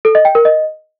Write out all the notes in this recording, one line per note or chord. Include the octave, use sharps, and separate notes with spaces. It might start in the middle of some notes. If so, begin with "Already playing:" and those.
A4
D#5
G5
A#4
D#5